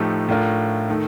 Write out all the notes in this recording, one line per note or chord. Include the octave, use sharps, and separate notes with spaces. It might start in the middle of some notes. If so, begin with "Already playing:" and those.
Already playing: A2 F3 A3 D#4 G4
A2 A3 D4 F4 A#4
D#3 A3